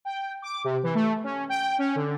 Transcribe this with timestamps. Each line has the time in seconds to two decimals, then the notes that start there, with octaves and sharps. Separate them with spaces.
0.05 G5
0.42 D6
0.64 C3
0.83 E3
0.95 A3
1.24 C#4
1.49 G5
1.79 C#4
1.96 D3